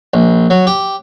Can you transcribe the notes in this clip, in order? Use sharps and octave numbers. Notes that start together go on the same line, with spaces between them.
A#1
F#3
G4